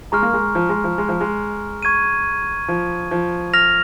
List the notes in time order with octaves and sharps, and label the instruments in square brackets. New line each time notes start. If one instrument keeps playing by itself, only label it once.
[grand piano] G#3 [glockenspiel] A#5 C#6 F6
[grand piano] A#3
G#3
F3
G#3
F3
G#3
F3
G#3
[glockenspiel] C#6 G#6 D#7
[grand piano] F3
F3
[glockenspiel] F6 A#6 F7